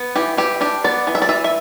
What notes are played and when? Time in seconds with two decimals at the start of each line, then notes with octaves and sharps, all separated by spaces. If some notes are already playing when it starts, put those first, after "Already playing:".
Already playing: B3
0.16 E3 G4
0.37 E3 G4
0.61 D4 G4
0.84 B3 D5
1.07 E3
1.15 E5
1.22 D5
1.29 E3 E5
1.44 E5